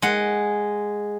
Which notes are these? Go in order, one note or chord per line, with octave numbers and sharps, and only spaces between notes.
G#3 F#5